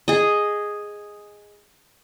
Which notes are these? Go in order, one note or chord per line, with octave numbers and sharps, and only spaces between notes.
G#4 D#5